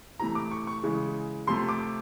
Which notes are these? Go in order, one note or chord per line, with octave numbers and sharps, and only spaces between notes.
C3 E3 A3 A#5
D6
C#6
C#6
C#3 E3 G#3
C3 F3 A3 C6
D6